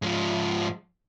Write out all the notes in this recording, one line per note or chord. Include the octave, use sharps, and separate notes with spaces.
G#2 F3